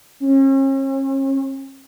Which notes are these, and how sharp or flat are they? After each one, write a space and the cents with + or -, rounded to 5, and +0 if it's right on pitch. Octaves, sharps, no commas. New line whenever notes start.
C#4 -40